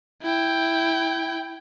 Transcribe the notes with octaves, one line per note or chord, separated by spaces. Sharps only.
E4 G5